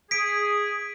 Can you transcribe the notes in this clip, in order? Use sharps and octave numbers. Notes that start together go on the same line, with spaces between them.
G#4 B6 D7